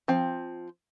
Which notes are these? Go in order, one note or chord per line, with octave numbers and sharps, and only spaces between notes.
F3 C4